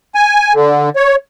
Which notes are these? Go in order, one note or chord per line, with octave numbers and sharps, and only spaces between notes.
G#5
D3
C#5